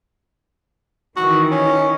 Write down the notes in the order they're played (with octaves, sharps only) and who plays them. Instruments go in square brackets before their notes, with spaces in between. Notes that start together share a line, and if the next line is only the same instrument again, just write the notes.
[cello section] D#3 E3 [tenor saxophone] F#4
[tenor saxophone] C#4